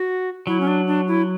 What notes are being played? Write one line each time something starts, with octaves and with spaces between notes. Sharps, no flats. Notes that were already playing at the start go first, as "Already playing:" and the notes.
Already playing: F#4
F#3 E4
C#4
D4
D4
E4